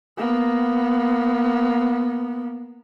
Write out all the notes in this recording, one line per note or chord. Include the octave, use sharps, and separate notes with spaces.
A#3 B3